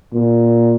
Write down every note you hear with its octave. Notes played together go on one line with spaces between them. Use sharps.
A#2